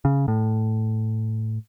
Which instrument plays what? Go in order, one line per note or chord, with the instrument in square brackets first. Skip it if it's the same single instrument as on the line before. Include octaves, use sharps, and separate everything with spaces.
[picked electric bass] C#3
A2